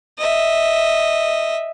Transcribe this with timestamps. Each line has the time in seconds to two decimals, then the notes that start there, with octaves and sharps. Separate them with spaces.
0.18 D#5 E5